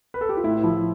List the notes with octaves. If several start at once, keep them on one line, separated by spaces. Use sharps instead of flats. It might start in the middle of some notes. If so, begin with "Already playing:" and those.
B4
A4
G4
F4
A2 E4
F3 E4